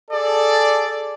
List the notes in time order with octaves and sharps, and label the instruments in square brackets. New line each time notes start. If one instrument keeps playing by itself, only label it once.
[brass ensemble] G#4 A4 D5